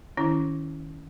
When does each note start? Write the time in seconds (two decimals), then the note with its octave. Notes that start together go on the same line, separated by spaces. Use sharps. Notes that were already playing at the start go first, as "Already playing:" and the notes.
0.17 D#3 C#4 E4